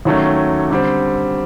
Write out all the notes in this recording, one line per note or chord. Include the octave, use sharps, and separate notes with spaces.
D#2 D#3 F#3 A3 C#4
D3 G3 C4